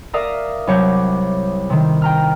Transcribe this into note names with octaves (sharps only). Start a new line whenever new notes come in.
A#4 D5 E5 F5 D#6
C2 F#3 C#5 D6 G6
C3 D#3
G5 A#5 F6